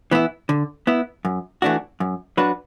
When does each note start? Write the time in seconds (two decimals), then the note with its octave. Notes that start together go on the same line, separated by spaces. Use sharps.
0.11 E3 B3 E4
0.49 D3
0.87 B3 E4
1.25 F#2
1.62 E3 A3 D4 F#4
2.00 F#2
2.37 F#3 D4 F#4 B4